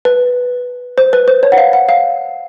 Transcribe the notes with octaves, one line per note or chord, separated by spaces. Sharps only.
B4
C5
B4
C5
C#5
F#5
F5
F#5
F5